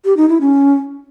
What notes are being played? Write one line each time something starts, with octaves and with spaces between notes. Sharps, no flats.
G4
D#4
E4
C#4